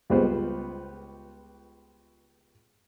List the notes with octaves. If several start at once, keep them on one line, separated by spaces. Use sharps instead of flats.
C#2 G3 G#3 B3 F4 C5